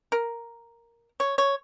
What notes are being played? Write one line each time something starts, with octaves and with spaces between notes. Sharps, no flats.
A#4
C#5
C#5